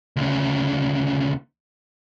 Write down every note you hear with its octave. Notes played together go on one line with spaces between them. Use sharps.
D2 C#3